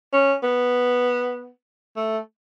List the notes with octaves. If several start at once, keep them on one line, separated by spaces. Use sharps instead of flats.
C#4
B3
A3